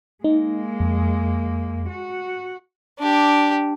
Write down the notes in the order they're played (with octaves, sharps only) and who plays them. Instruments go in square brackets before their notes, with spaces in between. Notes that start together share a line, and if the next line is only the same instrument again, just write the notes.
[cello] G#3 A#3 [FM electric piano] D#4
[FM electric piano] F2
[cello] F#4
[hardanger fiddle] D4 G4